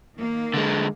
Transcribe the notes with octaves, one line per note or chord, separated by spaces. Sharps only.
D#3 A#3
D3 G#3